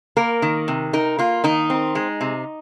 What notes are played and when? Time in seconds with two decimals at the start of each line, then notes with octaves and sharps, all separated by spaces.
0.17 A#3 A#4
0.42 D#3
0.68 C3
0.93 D#4 A#4
1.19 A#3 F4
1.44 D#3 D#4
1.70 C4
1.95 G#3
2.21 C3